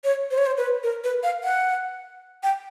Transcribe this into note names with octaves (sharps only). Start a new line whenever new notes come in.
C#5
C5
C#5
C5
B4
A#4
B4
F5
F#5
G5